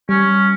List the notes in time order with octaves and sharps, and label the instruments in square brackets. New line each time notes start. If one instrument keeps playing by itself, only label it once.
[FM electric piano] G3 [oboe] C#4